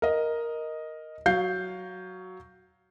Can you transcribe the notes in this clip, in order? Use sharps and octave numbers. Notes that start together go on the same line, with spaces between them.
A#4 D#5
F#3 F5 G6 C7